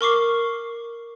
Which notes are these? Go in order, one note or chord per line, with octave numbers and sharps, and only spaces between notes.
A#4 C#6 D6 C7